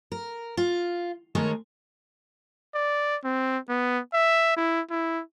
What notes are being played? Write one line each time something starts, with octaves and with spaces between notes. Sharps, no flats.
A#4
F4
D#3 G#3 A3 A#4 C#5
D5
C4
B3
E5
E4
E4